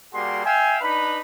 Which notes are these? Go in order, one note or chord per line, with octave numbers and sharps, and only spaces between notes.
G3 A#3 F#4 G#4 C6
E5 F5 G5 G#5
D4 D#4 B4 B5